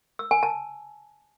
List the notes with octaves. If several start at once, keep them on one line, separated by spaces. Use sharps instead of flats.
E6
G#5
A5